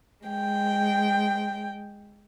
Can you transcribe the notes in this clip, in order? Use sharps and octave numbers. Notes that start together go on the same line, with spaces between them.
G#3 G5